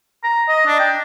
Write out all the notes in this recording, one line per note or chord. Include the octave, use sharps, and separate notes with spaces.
A#5
D#5
D4
G5